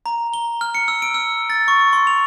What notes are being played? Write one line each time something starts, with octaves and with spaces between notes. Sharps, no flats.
A#5
G7
F6
C#7
E6
D7
E6
A6
C#6
C6
F7